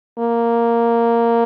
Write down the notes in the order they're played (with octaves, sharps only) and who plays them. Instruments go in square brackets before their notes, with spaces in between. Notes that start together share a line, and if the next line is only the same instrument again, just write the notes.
[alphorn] A#3